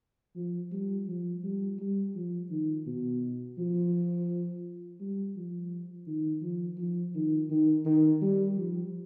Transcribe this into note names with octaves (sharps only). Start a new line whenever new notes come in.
F3
G3
F3
G3
G3
F3
D#3
B2
F3
G3
F3
D#3
F3
F3
D#3
D#3
D#3
G3
F3